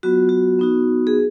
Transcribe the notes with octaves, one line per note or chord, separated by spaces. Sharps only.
F#3 B3 F4 F#4
F#4
B3 D#4 F#4
G#4